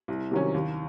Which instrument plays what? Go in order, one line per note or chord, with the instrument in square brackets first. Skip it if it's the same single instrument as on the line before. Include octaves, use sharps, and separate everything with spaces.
[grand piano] C2
C3 D#3 F#3 C#4
D#2